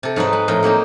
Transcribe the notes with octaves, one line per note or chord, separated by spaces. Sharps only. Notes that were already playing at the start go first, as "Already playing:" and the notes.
C3 A4
G#2 F#3 D#4 B4
G#3
F2 A2 A#4 G5
F#3 A#3 C4 D#4